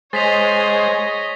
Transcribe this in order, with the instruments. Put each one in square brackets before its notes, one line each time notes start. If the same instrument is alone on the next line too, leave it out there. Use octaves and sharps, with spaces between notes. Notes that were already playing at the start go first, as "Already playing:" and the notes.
[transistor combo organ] G#3 C5 [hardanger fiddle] C#5 D#5 [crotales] A6 B6 F7